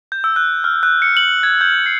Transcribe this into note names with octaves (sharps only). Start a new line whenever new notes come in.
G6
E6
F#6
F6
F#6
C#7
F#7
G#6
G6
C7